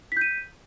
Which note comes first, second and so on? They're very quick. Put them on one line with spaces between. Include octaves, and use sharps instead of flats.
B6 G6 D#7